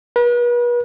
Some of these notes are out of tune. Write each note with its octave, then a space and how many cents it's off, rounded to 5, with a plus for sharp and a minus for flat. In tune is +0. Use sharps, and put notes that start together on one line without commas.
B4 -40